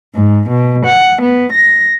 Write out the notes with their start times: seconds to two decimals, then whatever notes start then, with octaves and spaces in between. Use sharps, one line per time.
0.16 G#2
0.49 B2
0.86 F#5
1.22 B3
1.53 A#6